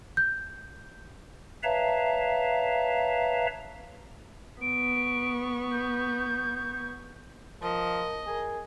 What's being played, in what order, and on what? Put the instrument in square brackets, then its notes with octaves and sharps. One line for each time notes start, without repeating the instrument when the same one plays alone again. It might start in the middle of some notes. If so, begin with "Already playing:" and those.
[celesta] G6
[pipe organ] B4 C#5 E5 F5 A5 A#5
[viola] B3 C#6 [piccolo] D7
[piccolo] G6
[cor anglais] F3 [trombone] A#4 [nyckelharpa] D#5
[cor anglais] G#4 [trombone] A#4